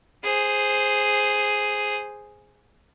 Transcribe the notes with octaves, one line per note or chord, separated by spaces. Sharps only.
G#4 C5